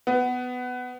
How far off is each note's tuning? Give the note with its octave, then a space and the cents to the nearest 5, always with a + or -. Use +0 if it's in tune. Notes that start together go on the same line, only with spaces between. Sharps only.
B3 +15